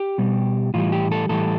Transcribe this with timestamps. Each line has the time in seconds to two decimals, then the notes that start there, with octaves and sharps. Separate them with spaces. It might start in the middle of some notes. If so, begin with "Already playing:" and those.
Already playing: G4
0.18 B2 G3
0.74 A2 E3 G3 F4
0.92 G4
1.11 A4
1.29 A2 E3 G3 A4